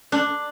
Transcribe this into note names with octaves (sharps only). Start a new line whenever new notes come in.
D4